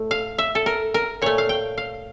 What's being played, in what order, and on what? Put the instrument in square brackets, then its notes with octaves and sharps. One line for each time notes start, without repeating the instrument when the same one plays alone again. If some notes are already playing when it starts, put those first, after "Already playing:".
Already playing: [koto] A2 A3
F5
E5
A4
A#4
A#4
A#2 A3 C#5
F5
G5
F5